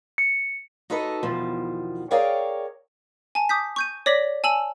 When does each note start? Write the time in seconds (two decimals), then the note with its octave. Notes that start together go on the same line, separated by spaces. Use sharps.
0.18 C#7
0.90 D#4 F#4 A4 B4 D#5
1.23 E2 B2 D#3 F3
2.11 G#4 A#4 C#5 D5 F5 G5
3.35 G#5 A5
3.49 D6 D#6 G6 B6
3.76 C#6 G6 D#7
4.06 C#5 D5 D6 A#6 B6 F#7
4.44 G#5 A5 E6 F#7